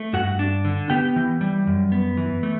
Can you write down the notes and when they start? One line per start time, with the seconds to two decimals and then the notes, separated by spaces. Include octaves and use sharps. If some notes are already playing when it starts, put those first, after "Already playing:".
Already playing: A3
0.13 G2 F#4 F#5
0.39 D4
0.65 D3
0.90 B3 G4 G5
1.16 E3
1.41 G3
1.67 F#2
1.92 B3
2.17 E3
2.43 A3